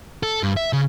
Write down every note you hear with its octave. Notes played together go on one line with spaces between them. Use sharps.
A4
G2
E5
C#3